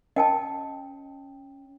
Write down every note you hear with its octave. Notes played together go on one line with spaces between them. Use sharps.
C#4 D#5 G5 A5